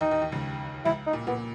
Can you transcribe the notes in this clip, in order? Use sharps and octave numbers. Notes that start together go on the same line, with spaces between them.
D#2 D#3 D#4
D#2 D#3
D#2 D#3
C#2 C#3
C#2 C#3 E4
D#4
A#2
A#2 B3